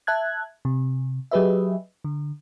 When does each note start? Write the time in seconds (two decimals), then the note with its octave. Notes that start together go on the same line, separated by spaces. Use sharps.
0.07 E5 A5 F#6 G#6
0.65 C3
1.31 F#3 G4 G#4 B4 D#5 E5
2.04 D3